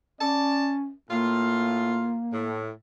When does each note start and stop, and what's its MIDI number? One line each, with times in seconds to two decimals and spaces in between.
0.21 0.92 61
0.21 0.75 74
0.21 0.75 81
1.11 2.17 45
1.11 2.63 58
1.11 2.17 65
2.33 2.70 45